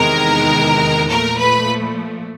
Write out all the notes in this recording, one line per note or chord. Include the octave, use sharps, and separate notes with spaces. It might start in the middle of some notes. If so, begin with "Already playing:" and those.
Already playing: E2 C3 D#3 G#3 A#4 A#5
A#2 F3 A3 A#4 A#5
B4 B5